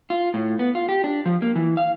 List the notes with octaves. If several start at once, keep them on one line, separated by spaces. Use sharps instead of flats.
F4
A2
B3
F4
G4
D4
F3
A#3
E3
F5